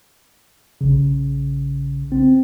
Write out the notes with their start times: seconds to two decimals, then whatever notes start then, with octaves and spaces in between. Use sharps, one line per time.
0.81 A#1 C#3
2.12 C4